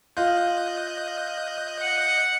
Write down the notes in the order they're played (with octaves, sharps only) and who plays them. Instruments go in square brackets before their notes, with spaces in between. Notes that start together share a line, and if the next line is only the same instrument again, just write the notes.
[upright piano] F4 [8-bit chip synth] D#5 F#6 G6
[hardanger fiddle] F#5